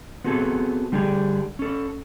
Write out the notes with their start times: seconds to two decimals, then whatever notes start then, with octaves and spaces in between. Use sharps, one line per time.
0.24 B3 C4 F#4 G#4 A4
0.92 D3 G3 D4 G4 G#4
1.59 C#4 A4